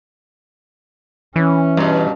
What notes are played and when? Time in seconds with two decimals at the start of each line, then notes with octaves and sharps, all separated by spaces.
1.36 E3 C#4
1.77 G2 B2